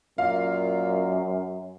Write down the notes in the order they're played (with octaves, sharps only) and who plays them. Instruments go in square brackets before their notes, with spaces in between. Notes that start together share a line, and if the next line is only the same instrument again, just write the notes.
[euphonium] F#2 [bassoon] A#2 [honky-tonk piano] F5